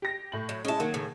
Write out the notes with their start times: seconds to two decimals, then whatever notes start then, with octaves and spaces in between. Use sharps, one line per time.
0.02 G4 A#6
0.32 A2 F#7
0.49 F#3
0.65 G#3 C#4 E4 A5
0.80 D#3 F#3 A#3
0.94 A2 C#3